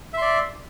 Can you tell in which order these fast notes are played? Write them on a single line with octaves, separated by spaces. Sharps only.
E5 C6 D5